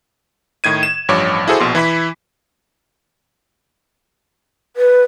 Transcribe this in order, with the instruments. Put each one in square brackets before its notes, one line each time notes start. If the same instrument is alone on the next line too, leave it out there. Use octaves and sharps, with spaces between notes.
[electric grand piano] A2 D#3 G#6 D#7
E7
A1 G2 F3 C#5 D6
E4 F#4 G#4 A4 C5
A#1 B2 C6
E3 E4 B5 B6
[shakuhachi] B4